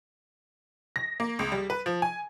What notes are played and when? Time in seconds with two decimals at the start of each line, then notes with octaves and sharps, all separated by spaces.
0.96 A#6
1.20 A#3
1.39 C#2
1.52 G3
1.70 B4
1.86 F3
2.02 G#5